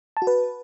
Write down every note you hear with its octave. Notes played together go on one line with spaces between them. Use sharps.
A5
F#4
B4